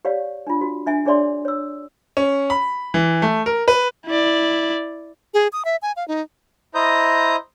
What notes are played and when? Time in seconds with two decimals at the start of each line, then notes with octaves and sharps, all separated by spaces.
0.05 G4 C#5 D5 F5
0.47 D4 F4
0.61 F#4
0.86 D4 E5 G#5
1.06 D4 G#4 C#5 D5 E5 C6
1.45 C#5 E6
2.17 C#4
2.50 B5
2.94 E3
3.22 A3
3.46 A#4
3.68 B4
4.06 E4 D5
5.34 G#4
5.53 D#6
5.65 E5
5.82 G#5
5.96 F5
6.08 D#4
6.75 E4 C5 D#5 A#5 D#6 G6